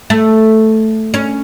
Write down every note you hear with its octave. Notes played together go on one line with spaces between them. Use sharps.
A3
C#4